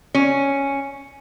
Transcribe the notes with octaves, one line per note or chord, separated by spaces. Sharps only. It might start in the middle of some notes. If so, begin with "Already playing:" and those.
C#4